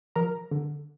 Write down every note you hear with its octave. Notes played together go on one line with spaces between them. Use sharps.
F3 A#4 A#5
D3